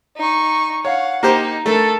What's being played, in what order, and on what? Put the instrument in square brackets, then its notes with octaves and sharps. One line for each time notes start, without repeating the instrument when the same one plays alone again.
[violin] D#4 C#6
[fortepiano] C#5 [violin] F5 F#5
[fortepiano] A#3 G4 C5 [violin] D#4
[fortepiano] A3 [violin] A4 A#4